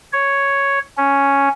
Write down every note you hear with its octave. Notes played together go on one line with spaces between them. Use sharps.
C#5
C#4